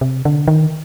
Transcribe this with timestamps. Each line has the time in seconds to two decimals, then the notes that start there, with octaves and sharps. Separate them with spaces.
0.01 C3
0.25 D3
0.48 D#3